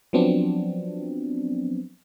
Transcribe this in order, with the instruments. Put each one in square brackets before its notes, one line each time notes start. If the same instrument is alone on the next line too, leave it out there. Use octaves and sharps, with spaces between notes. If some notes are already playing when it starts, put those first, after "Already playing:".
[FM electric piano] F3 F#3 B3 C4 D4